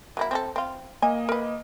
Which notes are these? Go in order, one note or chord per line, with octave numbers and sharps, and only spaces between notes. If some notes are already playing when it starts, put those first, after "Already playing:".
F#3 A#3 E4
C4 G#4 A4
C4 F4
A#3 D#5 G#5
A#4 B4